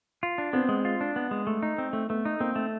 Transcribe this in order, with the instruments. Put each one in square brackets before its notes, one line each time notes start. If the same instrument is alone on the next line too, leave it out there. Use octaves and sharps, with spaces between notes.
[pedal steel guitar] F4
D4
[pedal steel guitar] B3 [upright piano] C4
[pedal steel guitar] G#3
F4
D4
B3
G#3
A3
D#4
C4
A3
[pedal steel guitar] A3 [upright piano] B3
[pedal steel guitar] D#4
[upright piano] A#3 [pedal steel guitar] C4
[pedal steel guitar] A3